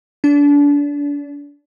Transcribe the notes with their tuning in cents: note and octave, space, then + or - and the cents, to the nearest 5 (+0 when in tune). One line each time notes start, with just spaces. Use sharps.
D4 -30